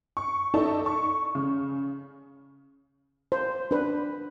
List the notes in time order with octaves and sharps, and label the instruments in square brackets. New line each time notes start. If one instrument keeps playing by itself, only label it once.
[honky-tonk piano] C#6
D#4 E4 A4 D5 A5
C#6
C#3
[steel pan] C5
D4 B4